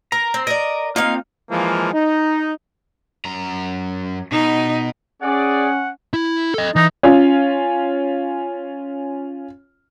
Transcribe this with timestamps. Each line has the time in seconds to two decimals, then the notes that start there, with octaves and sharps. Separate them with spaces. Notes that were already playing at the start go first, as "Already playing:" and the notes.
0.12 A#4 A#5
0.34 C4
0.47 A#4 D5 D#5
0.96 A#3 C4 D#4 F4 F5
1.50 E3 F3 G#3 A#3
1.93 D#4
3.25 F#2 A#5
4.32 B2 D#4
5.22 C#4 G#4 D5 F#5
6.14 E4
6.54 A4 D#5
6.76 E3 D#4
7.03 C#4 F4